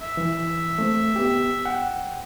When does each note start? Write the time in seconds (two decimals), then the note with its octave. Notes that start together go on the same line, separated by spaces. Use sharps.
0.02 E5
0.17 E3
0.78 A3 C4
1.16 B3 G4
1.65 F#5 G5